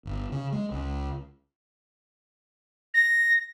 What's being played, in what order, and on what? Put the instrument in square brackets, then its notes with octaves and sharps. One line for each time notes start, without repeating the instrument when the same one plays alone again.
[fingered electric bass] G1
C#3
G#3
C#2
[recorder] A#6